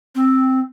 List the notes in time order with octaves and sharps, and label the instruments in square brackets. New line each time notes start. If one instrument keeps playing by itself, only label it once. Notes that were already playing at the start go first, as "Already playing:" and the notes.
[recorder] C4